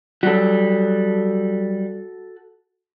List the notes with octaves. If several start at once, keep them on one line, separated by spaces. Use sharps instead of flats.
F#3 G3 F#4 A4